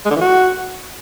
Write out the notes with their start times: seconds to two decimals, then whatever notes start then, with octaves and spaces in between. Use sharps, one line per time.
0.05 G#3
0.11 D3
0.16 E3
0.21 F#4